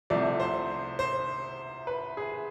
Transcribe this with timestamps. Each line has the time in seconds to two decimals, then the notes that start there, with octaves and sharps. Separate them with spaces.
0.10 C2 C3 F3 A3 D5
0.40 C5
0.99 C5
1.87 B4
2.17 G#4